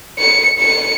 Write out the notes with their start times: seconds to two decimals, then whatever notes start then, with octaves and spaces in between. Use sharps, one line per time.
0.19 C#7
0.59 C#7